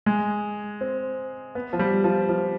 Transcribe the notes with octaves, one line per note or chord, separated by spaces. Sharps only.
G#3
C4
B3
F3
G3
F3
F3